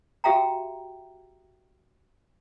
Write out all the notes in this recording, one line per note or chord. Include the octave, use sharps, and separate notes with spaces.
F#4 G4 E5 F5 G5 A#5